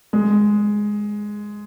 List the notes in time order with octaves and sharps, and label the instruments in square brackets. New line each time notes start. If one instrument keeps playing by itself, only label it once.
[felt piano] G#3